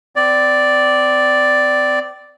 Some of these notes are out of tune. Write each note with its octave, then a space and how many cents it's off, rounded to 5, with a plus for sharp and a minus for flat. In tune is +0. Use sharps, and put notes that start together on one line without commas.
C4 -30 D5 +0